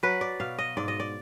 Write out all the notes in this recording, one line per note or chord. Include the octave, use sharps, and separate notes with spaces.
F#3 B4
D5
B2 F5
D#5
G#2 D5
D#5
D5